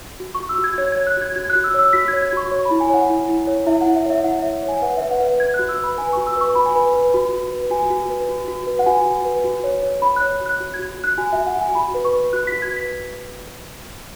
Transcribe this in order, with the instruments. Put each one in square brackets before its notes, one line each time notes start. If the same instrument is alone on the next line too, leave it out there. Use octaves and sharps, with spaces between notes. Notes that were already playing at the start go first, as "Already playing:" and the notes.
[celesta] F#4
C#6
F#4
E6
F#4
G#6
C#5 G#6
C#5 G#6
F#6
F#4 G#6
F#4 G#6
F#6
F#4
E6
C#5 E6
F#4 B6
G#6
C#5
G#6
F#4 C#6
C#5 C#6
B5
E4
G#5
C#5 F#5
E4
E4
C#5
E4 E5
E4 F#5
E5
C#5 E5
E4 F#5
C#5 E5
C#5
G#5
B4 F#5
B4 E5
F#5
B4
F#5
B4 G#6
F#6
F#4
E6
B4
B5
B4 G#5
F#4 C#6
E6
B4 C#6
F#4 B5
G#5
B4 B5
B4
F#4
F#4
B4
F#4 G#5
F#4
B4
F#4
F#4
B4
F#5
F#4 G#5
F#4
B4
F#4
C#5
C#5
C#5 B5
C#5 F#6
F#4
F#6
F#4
G#6
F#4
F#4
F#6
F#4 G#5
F#4 E5
F#5
F#4 G#5
F#4 B5
B4
C#6
B4
F#4 F#6
F#4 B6
G#6
B4 B6